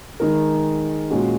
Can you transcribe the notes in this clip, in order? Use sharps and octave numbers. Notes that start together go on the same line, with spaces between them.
D#3 G#3 D#4 A#4
A#2 G#3 C#4 F#4